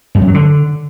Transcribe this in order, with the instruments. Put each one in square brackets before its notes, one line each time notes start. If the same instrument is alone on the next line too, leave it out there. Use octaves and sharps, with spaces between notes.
[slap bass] G2
F#2
F#3
D3